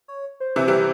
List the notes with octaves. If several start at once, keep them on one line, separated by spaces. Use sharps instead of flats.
C#5
C5
C3 E3
E3 G3